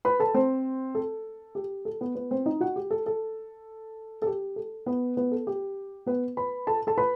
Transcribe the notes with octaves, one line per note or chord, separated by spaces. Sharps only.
B4 B5
A4 A5
C4 C5
A4
G4
A4
B3 B4
B3 B4
C4 C5
D#4 D#5
F#4 F#5
G4
A4
A4
A4
G4
A4
B3 B4
B3 B4
A4
G4
B3 B4
B4 B5
A4 A5
A4 A5
B4 B5